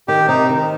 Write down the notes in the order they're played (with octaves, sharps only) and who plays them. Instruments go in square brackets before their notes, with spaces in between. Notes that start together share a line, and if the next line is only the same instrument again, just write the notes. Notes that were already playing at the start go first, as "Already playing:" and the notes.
[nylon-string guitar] D#3 [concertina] G4
[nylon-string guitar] C3 [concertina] D#4
[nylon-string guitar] D#3